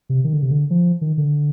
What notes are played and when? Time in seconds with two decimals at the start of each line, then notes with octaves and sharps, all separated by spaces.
0.09 C3
0.24 D#3
0.33 D3
0.42 C3
0.51 D3
0.70 F3
1.01 D#3
1.17 D3